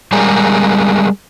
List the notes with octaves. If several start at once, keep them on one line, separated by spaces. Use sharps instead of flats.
G3 G#3 G#4 A#4